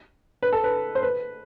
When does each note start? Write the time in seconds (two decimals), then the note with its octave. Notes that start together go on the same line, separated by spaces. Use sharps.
0.42 B4
0.53 A4
0.64 B4
0.95 C5
1.03 B4